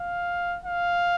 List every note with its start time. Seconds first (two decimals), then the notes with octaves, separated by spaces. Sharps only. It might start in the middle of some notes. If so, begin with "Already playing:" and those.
Already playing: F5
0.65 F5